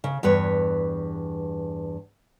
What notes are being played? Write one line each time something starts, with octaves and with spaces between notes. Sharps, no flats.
C#3
E2 G2 B4 C#5